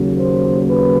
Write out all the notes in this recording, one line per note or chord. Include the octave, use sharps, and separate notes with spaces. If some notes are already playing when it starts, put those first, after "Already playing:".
Already playing: D#2 C#3 F#3 A#3
C5
B4